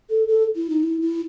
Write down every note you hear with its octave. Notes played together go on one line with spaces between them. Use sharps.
A4
A4
E4
D#4
E4
E4